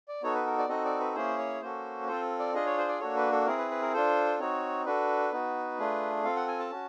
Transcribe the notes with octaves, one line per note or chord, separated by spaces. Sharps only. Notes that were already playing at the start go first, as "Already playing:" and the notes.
D5
B3 D#4 F#4 A4 C#5
B4
A#4
D5
C4 D#4 F#4 A4 D#5
D5
B4
A#3 C#4 E4 G#4 C5
C#5
A#3 C#4 F#4 A4 C5
C4 F4 A4 C5
D5
D4 F4 G#4 D#5
C#5
C5
D5
A#3 D4 F#4 A4 C#5
B4
A4
C4 E4 G#4 A#4
B4
B4
A#4
D4 F4 A4 C5
C4 D#4 F#4 C#5
D4 F#4 A4 B4
B3 D#4 F#4
A3 D4 F4 G#4
C4 F4 A4 F5
F#5
G#5
A5
C#4 F#4